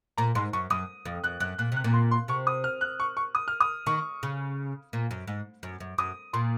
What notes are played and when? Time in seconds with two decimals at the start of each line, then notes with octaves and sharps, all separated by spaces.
0.18 A#2 A#5
0.35 G#2 C6
0.53 F#2 C#6
0.70 F#2 D#6
1.06 F2
1.24 F2 F#6
1.40 F#2 F#6
1.58 A#2 F#6
1.72 C3 F#6
1.84 A#2
1.94 C6
2.11 C6
2.28 C3 C#6
2.47 D#6
2.64 F6
2.81 F#6
3.00 C#6
3.17 C#6
3.35 D#6
3.48 F6
3.60 D#6
3.86 D#3 C#6
4.23 C#3
4.93 A#2
5.11 F#2
5.27 G#2
5.63 F#2
5.80 F#2
5.98 F#2 D#6
6.33 A#2 C6